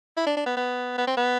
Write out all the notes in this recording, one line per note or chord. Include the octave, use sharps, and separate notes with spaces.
E4
D4
D4
B3
B3
B3
C4
B3